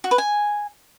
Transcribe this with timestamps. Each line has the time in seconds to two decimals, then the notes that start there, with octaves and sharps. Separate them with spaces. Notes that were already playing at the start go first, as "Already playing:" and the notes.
0.04 F#4
0.11 B4
0.18 G#5